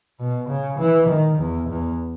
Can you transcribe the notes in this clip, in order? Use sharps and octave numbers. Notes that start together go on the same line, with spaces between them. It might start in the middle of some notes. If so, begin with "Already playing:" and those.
B2
C#3
E3
D#3
E2
E2